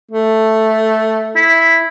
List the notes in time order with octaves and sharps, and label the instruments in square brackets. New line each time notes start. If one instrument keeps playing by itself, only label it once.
[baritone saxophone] A3
[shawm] E4